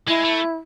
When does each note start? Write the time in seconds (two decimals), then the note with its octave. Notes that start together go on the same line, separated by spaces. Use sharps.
0.08 G#3 E4
0.24 A3